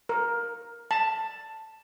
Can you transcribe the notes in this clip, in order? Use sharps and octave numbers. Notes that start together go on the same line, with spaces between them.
A#4
A5